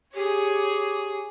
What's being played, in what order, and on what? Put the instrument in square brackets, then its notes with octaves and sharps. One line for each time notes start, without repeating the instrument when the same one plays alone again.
[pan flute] G4 [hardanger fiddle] G#4 C#5